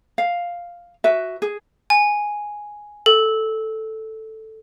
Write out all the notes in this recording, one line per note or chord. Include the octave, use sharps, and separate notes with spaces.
F5
F#4 B4 E5
G#4
G#5
A4